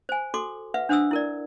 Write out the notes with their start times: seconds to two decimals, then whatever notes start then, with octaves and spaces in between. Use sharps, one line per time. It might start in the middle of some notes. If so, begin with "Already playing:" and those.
0.09 C5 G#5
0.34 F#4 A4 C6 D6
0.74 B4 E5 F#5
0.89 D4 C5 F#5 D#6 E6
1.11 E4 A#4 D5